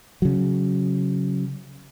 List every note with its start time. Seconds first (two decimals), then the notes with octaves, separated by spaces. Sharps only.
0.22 C#3 F#3